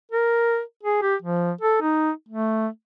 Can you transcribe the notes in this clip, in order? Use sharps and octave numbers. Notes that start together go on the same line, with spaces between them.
A#4
G#4
G4
F3
A4
D#4
A3